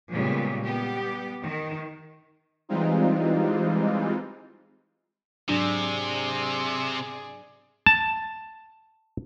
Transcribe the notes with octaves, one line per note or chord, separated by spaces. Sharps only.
A#2 C#3 G3 G#3 B3
G3 B3 G4
D#3
E3 G3 G#3 C4 D#4 F4
G#2 C3 F#3 D4 G#4 D5
A5